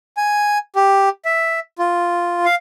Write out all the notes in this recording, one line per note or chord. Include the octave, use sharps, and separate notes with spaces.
G#5
G4
E5
F4
F5